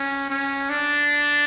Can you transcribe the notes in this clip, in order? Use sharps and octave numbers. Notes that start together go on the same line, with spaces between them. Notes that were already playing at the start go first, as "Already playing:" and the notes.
Already playing: C#4
C#4
D4